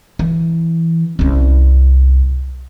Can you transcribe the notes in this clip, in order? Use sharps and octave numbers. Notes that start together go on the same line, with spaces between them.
E3
C2 C#4